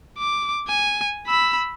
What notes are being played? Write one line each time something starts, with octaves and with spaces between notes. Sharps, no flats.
D6
G#5
B5 E6